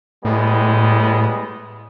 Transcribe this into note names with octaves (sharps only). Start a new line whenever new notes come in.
A2 G3 G#3 B3